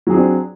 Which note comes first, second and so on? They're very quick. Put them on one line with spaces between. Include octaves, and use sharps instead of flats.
F#3 G#4 C4 D4